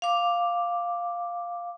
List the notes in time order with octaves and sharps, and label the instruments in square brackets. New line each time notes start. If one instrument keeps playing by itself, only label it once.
[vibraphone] F5 D6